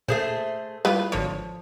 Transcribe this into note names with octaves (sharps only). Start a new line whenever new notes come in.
A#2 A3 G#4 C5
G3 E4 F4 B4 D#6
G#1 D3 F3 C#5